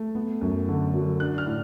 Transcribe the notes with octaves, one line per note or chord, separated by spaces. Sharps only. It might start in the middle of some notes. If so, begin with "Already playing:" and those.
Already playing: A3
B3
F#2
D3
F#3
D4 F#6
F6
A2